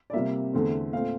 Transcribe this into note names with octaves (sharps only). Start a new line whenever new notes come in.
D5
C3 G3 A#3 E5
E2 D3 A3 C4
A#2 A3 C4 F5